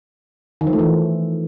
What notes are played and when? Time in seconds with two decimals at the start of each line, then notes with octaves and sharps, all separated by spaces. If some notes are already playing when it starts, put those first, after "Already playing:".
0.61 D#3
0.67 F3
0.73 A3
0.79 E3